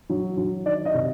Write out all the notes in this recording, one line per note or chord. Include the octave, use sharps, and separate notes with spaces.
F#3
F#3
D#3 D5
D#5
C3